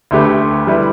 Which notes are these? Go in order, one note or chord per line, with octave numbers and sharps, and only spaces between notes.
D2 D3 A3 G4 B4
G3 E4 B4